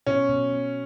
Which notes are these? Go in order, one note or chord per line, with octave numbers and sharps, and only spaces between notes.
B2 C#4
B2
B3